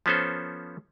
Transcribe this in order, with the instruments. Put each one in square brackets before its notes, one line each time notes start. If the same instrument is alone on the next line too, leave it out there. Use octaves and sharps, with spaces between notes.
[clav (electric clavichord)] F3 B3 C#4 A4 C5